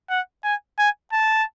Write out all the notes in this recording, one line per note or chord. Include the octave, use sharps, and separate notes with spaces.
F#5
G#5
G#5
A5